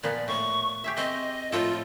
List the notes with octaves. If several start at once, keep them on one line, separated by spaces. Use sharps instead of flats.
A#2 F3 B3 D5
A2 C#6
G4 G#4 E5
C4 D#5
A2 F3 F4 A4